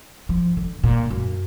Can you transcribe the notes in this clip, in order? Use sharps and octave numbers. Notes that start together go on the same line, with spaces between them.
F3
D3
A#2
F#2